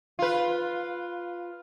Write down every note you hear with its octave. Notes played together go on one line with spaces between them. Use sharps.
F4 B4